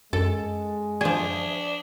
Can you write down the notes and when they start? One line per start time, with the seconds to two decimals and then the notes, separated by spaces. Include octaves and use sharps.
0.13 F#2 G#3 A4
1.01 F3 D4 G#4